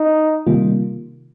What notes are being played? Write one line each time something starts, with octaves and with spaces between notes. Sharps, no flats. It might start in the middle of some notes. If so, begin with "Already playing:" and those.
Already playing: D#4
C3 D#3 G3 A#3 F4